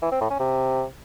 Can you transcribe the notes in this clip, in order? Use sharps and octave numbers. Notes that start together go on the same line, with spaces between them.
E3
C4
A2
C#4
C3